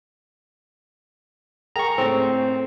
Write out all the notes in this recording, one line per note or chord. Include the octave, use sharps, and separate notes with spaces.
G#4 A#4 G5 A#5 C#6
A2 C4